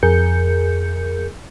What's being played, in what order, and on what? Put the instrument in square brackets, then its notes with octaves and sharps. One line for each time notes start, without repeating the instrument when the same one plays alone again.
[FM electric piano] F2 G#4 A#4 G6 C#7